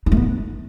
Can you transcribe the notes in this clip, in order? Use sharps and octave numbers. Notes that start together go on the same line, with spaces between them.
D#4
G#3
B3
D4